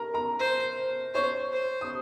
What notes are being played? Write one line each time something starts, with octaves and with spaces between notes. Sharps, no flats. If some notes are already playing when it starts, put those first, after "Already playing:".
Already playing: A#4 A#5
A#4 A#5
C5
C5 C#5 C#6
C5
D#6